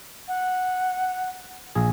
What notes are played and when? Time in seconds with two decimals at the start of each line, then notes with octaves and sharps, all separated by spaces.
0.28 F#5
1.75 A#1 G#4